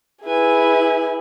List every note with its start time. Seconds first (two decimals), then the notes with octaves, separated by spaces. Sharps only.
0.25 E4 G#4 B4 G#5